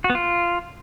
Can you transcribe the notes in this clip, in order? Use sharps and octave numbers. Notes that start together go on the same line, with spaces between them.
F#4
B3
F4